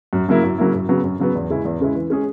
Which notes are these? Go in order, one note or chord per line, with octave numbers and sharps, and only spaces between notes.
F#2
C#3 F#3 A#3 E4
F#2
C#3 F#3 A#3 E4
F#2
C#3 F#3 B3
F#2
C#3 F#3 B3
E2
C#3 G#3 C#4 E4
E2
C#3 G#3 C#4 E4
E3
G#3 C#4 G#4